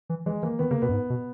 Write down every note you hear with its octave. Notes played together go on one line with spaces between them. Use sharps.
E3
E3 G#3
E3 A#3
D#3 B3
C#3 A#3
B2 B3
F#2
G#2
B2